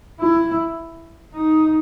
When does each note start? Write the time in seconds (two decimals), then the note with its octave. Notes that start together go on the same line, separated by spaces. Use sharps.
0.20 E4
1.35 D#4